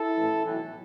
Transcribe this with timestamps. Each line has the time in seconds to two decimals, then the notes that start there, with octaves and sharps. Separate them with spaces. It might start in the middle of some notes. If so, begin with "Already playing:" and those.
Already playing: E4 A4
0.16 A1 A2 E3
0.46 B1 A2 E3